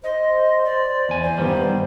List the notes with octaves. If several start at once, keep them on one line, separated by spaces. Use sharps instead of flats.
C5 D#5
D5
E2 G#5
C5
G2 D#3 G3 B3